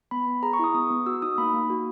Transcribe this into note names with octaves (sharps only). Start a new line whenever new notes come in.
B3 B5
B3
G#4 A#5
C#6
E4 D#6
B3 D#6
B3
F#4 E6
D#4 D#6
A#3 B5
A#3
F#4